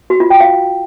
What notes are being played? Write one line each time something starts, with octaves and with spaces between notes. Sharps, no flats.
F#4
F4
G5
F5